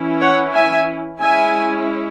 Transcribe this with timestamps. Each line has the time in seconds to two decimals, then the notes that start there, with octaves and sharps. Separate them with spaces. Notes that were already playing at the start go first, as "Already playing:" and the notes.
Already playing: E3 C#4 E4
0.21 C#5 F#5
0.54 E5 G#5
1.19 G#3 C#4 E4 E5 G#5